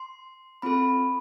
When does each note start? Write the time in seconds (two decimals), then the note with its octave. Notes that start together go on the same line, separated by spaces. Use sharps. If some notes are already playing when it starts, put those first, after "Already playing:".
Already playing: C6
0.62 C4 F4 A4 B5